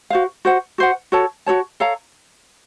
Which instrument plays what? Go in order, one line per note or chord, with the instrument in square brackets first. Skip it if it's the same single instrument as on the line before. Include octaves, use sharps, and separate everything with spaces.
[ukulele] F#4 C5 F5
F#4 C5 F#5
F#4 C5 F#5
F#4 A4 C#5 A5
F#4 A4 C#5 A5
A4 C#5 F5 A#5